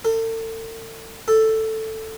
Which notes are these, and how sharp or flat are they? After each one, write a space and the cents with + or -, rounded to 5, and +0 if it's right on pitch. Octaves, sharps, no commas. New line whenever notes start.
A4 +40
A4 +5